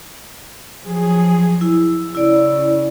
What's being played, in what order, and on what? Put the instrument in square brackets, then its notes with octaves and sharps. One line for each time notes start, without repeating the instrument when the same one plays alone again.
[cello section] F3 F#3 G#4
[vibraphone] E4
[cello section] C#3 [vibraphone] E4 D5